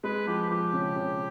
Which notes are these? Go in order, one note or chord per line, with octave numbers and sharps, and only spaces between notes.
G#3 B4
F3 G4
F3 G4
C#3
C#3